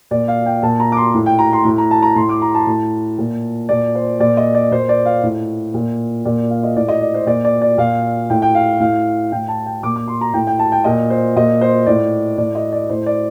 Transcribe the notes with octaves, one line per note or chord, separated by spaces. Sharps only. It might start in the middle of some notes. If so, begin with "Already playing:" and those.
A#2 D5
F5
G5
A#2 A5
A#5
D6
C6
A2
G5
A#5
C6
A2
A#5
A5
A#5
A2 C6
D6
A#5
A5
A2
A#2
A#2 D5
C5
A#2 D5
D#5
D5
A#2 C5
D5
F5
A2
A#2
A#2 D5
F5
D#5
A2 D5
D#5
D5
C5
A#2 D5
D5
D5
A#2 F5
A2 G5
G5
F5
A2 F5
A2 G5
A5
G5
A#2 D6
D6
C6
A#5
A2 G5
G5
A5
G5
A#2 D#5
C5
A#2 D#5
C5
A2 D5
A2 D5
D#5
D5
A2 C5
D5